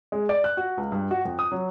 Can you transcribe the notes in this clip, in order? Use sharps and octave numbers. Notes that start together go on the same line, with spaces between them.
G#3
D5
F#6
F#4
C#2
G2
F#4
F2
D#6
F#3